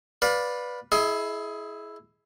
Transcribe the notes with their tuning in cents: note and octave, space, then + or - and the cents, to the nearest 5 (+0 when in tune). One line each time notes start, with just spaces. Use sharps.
B4 -5 D5 +0 F5 +30
E4 +0 G#4 +25 D#5 +25